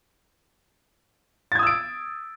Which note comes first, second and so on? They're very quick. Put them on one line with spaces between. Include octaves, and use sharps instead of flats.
A6 G#6 D#6 E6 D7